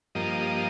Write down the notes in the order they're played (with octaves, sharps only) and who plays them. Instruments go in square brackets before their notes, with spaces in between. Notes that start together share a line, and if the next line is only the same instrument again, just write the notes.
[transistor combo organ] G2 F3 A#3 D#5